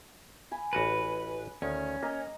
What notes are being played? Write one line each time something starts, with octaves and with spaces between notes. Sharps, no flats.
G#5 B5
A1 F#4 B4 A5
D2 D#3 C#4
A#3 D#5 A#5